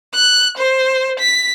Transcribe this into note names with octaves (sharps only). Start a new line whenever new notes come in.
F#6
C5
B6